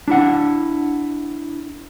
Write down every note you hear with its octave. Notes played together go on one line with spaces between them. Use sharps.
D4 E4 F#5